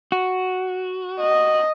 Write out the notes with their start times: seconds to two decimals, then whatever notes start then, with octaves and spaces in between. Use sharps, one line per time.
0.12 F#4
1.20 D#5